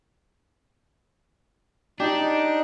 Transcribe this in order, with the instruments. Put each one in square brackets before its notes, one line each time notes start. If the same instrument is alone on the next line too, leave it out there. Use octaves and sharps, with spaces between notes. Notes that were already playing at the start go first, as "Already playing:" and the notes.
[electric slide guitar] D4 [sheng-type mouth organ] D#4 [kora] G4